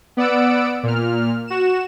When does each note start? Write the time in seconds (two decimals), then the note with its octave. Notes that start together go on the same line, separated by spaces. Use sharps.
0.17 B3 D5 F#5 E6 D7
0.83 A#2 F6
1.48 F#4 E7